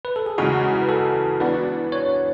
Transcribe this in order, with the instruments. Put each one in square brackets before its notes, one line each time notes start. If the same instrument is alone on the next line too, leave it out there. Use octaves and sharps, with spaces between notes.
[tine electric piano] B4
A4
G#4
[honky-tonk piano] E2 C#3 E3 G#3 [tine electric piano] F#4
[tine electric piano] B4
A4
[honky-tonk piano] E3 B3 D4 F#4 [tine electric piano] B4
[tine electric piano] C#5